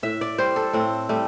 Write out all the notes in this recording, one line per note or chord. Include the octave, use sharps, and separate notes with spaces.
A2 E5
D5
G3 C5
A4
A2 C4
G3 A3